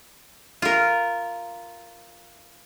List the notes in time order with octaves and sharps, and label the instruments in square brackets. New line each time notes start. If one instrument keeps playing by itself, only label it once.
[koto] F4 A#4